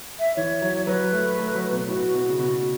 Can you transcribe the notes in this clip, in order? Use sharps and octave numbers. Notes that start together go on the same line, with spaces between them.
E5
E3 C#5
F#3
F#3 B4
A3
A3
F#3
B2
A2 F#4
B2
C#3
B2